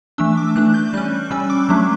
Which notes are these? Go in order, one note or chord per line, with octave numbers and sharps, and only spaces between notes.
E3 A3 D4 E6
D6
E3 A3 D4 F#6
G6
G3 C#4 F#6
G3 C#4 E6
D6
F#3 A3 D4